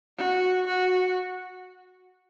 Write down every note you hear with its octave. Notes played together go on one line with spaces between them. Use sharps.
F#4
F#4